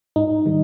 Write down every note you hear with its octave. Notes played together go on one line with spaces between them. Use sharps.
G#2 D#4
D#3 G3